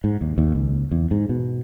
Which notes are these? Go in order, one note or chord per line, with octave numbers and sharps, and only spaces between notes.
G#2
D#2
D#2
C#2
E2
G#2
B2